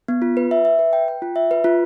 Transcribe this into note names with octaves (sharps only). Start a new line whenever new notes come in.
B3
F4
B4
E5
E5
B4
G5
G5
F4
E5
B4
F4